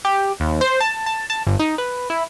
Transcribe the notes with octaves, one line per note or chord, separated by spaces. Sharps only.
G4
D#2
C5
A5
A5
A5
G1
D#4
B4
E4